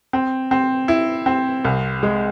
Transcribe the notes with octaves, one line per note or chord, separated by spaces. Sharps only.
C4
C4
E4
C4
C2
G#3